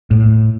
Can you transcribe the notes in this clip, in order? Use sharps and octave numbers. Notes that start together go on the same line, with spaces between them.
A2